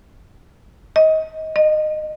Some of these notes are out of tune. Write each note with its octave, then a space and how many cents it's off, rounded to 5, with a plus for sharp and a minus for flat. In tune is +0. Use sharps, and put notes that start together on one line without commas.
D#5 +25
D#5 -20